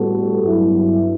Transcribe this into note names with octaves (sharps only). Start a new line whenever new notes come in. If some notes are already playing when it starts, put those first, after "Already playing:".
Already playing: A2 G3 B3 F#4 A4
G2 F#3 B3 E4